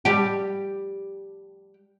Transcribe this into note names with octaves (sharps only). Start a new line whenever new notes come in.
G3 G4